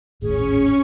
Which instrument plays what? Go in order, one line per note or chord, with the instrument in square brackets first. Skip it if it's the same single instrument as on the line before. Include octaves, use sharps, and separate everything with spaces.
[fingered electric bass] D#1 G#1 A2 [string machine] C#4 C#6 [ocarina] G#4